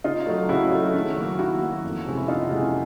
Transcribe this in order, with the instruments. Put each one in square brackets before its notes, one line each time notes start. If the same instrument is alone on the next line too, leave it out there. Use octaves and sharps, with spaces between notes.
[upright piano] C#3 D#4 F4
F#3 A3
C#3 E4 F#4
F#3 A3
D#3
F#3 A#3
D#3 E4 F#4
F#3 A#3
F2
C3 E3 G#3 C#4
E4
F2 D#4 F4
C3 E3 G#3 C#4